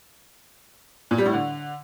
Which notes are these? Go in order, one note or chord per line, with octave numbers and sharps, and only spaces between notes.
A#2
G3
A2
D3